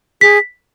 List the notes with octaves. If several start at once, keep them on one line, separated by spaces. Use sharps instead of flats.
G#4 B6